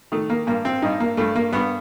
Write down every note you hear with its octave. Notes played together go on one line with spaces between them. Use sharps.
D#3 A3
A#3
G2 A#3
C4
G2 D#4
A#3
G2 A3
A#3
G2 B3